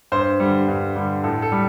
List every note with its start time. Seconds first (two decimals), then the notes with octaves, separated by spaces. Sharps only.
0.12 G2 C5
0.40 D3 G3
0.68 G2
0.96 D3 G3
1.24 A2 A4
1.42 A4
1.52 G3